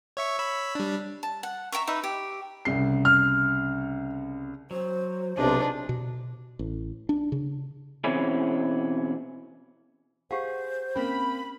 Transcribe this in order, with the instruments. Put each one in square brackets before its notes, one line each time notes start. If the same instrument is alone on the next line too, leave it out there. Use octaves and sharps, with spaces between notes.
[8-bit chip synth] C#5 E5 C#6
C#5 B5 E6
G3 D4
[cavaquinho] A5
F#5
E5 G5 A#5 C#6
D#4 B4 E5
G4
[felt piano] C2 C#3 C7
[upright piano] F6
[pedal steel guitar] F#3 [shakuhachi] C5
[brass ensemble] B1 C3 [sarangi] D4 [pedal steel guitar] D#4 F4 G#4
[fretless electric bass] B2
A1
D4
C#3
[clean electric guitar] B2 E3 C4 C#4 E4 G#4
[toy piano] G4 F5 F#5 [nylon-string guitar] G#4 [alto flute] C5
[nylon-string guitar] A#3 C4 [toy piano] C#4 [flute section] B5